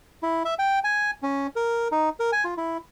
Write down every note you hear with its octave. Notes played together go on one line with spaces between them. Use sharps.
E4
E5
G5
G#5
C#4
A#4
D#4
A#4
G#5
F4
E4